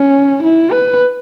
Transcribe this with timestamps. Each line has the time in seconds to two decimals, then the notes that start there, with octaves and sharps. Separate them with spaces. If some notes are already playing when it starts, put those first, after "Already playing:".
Already playing: C#4
0.43 E4
0.71 B4